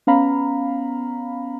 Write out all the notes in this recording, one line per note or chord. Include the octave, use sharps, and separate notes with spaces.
B3 C#4 F5 A#5 B5